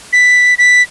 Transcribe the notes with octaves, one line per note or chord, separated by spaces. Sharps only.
B6
B6